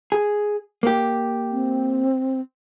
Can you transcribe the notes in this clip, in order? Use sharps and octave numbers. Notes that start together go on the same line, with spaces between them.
G#4
A#3 G4
C4